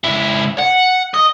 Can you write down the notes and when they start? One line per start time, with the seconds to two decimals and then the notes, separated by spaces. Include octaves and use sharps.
0.04 C#2 E4
0.58 F#5
1.14 D#5